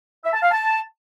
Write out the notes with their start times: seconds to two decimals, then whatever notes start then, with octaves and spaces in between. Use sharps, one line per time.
0.25 E5
0.34 A5
0.43 F5
0.52 A5